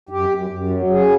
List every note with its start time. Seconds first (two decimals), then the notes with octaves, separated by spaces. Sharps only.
0.09 F#2 G4
0.29 F#2
0.50 F#2
0.70 F#3
0.90 C#3 G#4